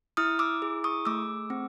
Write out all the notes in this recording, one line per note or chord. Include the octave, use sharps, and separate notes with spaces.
E4 D#6 F6
D6 E6
G#4
C#6 D#6
A3 D6 E6
C4